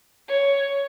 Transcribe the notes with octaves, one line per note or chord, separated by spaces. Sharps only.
C#5